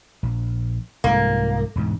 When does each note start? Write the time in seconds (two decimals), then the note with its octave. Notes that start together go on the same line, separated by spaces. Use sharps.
0.23 A#1
1.04 C2 G#2 F3 A#3
1.76 E1 D2 G#2